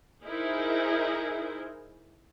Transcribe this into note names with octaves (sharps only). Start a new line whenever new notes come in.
D#4 E4 G#4 A#4 C5